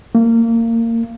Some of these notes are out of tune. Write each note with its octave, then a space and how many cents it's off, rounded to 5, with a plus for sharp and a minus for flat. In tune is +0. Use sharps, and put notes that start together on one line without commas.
A#3 -25